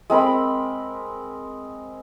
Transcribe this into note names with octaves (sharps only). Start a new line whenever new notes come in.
G#3 C4 A#4 B5